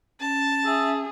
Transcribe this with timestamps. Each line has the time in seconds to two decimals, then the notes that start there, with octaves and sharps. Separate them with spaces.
0.20 C#4 A5
0.65 G#4 E5